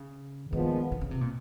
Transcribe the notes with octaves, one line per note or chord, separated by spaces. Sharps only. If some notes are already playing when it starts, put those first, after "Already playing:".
Already playing: C#3
A#2 D#3 F3 G#3 B3
D3
C#3
C3
A#2